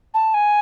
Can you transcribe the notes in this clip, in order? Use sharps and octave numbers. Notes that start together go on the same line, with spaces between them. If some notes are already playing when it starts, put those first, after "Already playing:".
A5
G#5